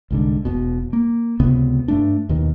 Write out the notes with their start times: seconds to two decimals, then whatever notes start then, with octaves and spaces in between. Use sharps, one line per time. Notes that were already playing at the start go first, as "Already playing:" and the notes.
0.11 C2 G#2 D3
0.45 E1 B2
0.93 A#3
1.40 C#2 C3 B3
1.88 G2 A3 D4
2.29 D#2 B2 D#3